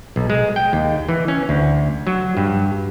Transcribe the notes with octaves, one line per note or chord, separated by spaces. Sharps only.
B1
G#3
G5
D#2
E3
C#4
D2
F#3
G2